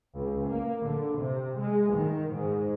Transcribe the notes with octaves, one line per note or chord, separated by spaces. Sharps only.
C#2
A#3
D3
C3
G#3
D#3
G#2